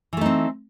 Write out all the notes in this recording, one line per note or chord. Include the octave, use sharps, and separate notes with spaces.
E3 A3 C4 D#4